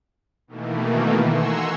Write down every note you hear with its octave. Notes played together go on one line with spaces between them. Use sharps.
B2 D#3 E3 A3 A#3
F#5 G#5 A#5 C6 C#6 E6